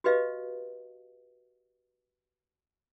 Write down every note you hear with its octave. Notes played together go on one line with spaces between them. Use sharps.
F#4 G4 B4 D#5 F5